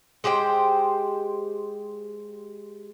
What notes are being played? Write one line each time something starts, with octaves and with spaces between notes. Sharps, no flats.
G#3 G4 C5 G5